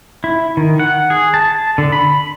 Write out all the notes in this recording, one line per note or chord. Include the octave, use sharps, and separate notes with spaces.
E4
D#3
F#5
G#4
A5
D3
B5